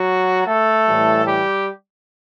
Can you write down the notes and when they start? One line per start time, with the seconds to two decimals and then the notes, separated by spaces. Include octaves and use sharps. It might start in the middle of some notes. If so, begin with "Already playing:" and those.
Already playing: F#3 F#4
0.46 A3 A4
0.85 A2 E3 G3
1.26 G3 G4